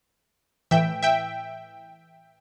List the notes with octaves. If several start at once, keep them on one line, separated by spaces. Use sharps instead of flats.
A2 E3 E5 G5
E5 G5